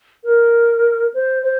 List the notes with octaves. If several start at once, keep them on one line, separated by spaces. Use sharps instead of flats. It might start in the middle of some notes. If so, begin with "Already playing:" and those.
A#4
C5
C5